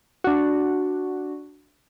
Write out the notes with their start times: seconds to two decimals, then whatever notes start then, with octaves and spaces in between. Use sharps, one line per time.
0.24 D4 F#4